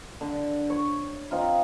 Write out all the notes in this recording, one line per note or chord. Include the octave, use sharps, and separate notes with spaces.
D3
C#5
C4 D#4 F4